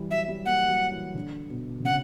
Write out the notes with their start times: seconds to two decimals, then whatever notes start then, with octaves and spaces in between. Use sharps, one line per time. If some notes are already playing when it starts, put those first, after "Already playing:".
Already playing: E3 G3
0.10 F#3 E5
0.28 G3
0.46 A#3 F#5
0.69 F#3
0.92 E3
1.15 D3
1.50 B2
1.80 D3
1.84 C#3 F#5